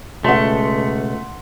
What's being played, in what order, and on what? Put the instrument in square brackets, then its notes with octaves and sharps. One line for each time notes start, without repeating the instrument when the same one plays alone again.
[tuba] C#2 [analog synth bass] B2 [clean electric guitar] A3 [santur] F#5 C6